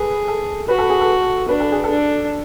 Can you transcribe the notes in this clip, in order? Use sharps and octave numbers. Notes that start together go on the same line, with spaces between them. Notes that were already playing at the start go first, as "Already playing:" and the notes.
Already playing: G#4 A4 B4
A4
F#4 B4
A4
G#4
A4
D4 B4
A4
G#4
A4
D4